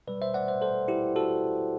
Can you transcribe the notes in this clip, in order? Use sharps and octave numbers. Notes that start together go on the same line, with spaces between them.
B2 G3 B4 D5
C5 E5
D5 F#5
C5 E5
A4 C5
E4 G4
F#4 A4